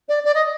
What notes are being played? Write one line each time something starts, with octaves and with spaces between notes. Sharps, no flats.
D5
D5
D#5